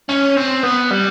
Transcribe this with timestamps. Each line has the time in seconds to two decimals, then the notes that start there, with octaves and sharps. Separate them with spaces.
0.09 C#4
0.37 C4
0.63 B3
0.91 G3